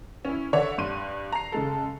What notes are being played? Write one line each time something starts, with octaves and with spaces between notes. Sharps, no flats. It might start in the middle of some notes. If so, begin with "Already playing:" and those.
C#4 E4
D3 C#5 E5
G2 C6 D#7
A#5 C7
C#3 G#3 A4